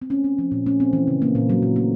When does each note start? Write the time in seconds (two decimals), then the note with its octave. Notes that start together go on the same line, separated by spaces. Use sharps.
0.02 C4
0.10 A3 C#4
0.24 C4
0.39 F3
0.51 A#2
0.66 A3 C#4
0.80 C4
0.93 E3
1.07 C#3
1.22 A#3
1.35 A#2
1.50 F#3
1.62 A#2
1.76 A3